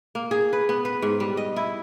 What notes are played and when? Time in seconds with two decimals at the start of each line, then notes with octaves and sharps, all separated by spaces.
0.15 A#3
0.31 G#4
0.53 B4
0.69 B3
0.85 B4
1.02 G#2
1.20 G3
1.37 D#5
1.56 E4